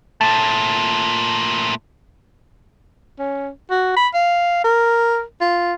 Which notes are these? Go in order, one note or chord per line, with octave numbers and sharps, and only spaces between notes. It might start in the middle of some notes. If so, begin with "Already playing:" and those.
A#2 A3 A5
C#4
F#4
B5
F5
A#4
F4